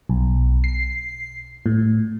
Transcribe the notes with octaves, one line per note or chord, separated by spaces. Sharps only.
B1
C7
A2